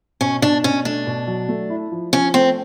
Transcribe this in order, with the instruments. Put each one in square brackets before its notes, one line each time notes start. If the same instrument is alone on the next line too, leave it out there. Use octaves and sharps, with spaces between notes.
[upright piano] B2 [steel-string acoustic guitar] C#4
[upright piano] B2 [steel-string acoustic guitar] D4
[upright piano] B2 [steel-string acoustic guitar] C#4
[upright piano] A3 [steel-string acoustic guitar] D4
[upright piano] B2
F#3
A3
E4
F3
[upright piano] F3 [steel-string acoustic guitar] C#4
[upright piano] A3 [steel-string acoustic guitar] C4